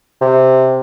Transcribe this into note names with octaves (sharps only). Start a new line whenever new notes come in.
C3